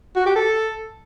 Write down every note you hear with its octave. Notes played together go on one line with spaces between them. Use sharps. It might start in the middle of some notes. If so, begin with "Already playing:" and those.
F#4
G4
A4